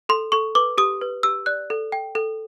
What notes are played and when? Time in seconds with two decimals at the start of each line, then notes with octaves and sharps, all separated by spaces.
0.09 A4 C6
0.32 A4 C#6
0.55 B4 D6
0.78 G4 D#6
1.01 B4
1.23 G4 E6
1.46 D5 F#6
1.70 A4
1.92 G5
2.15 A4